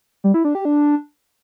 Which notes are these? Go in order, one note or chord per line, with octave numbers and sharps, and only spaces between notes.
G3
E4
D4
G4
D4